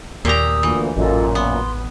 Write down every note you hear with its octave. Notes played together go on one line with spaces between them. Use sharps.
D#2 A#2 G4 A#5 D#6 E6
D2 A#2 E3
A1 F#2 A#2 F4 A4 D#5
B3 C6